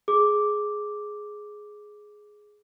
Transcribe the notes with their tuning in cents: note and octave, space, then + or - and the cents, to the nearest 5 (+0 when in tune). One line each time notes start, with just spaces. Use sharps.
G#4 +10 D6 +0